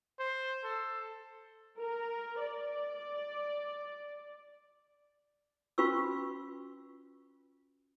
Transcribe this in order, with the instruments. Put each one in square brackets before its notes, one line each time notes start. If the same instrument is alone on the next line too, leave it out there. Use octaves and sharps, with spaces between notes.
[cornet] C5
A4
[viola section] A#4
D5
[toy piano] C#4 F4 F#4 B4 C#6 E6